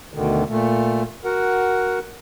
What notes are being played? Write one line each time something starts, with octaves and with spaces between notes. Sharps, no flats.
D2 B2 D3 D#3
A#2 A3
F#4 A#4 F#5